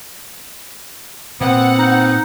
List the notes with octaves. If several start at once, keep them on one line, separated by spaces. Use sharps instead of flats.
A#2 B3 C4 F#5
D#4